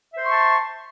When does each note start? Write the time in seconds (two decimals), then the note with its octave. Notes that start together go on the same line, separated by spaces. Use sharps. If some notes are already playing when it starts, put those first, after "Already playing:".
0.14 E5
0.18 C5
0.22 C6
0.26 C#6
0.30 A5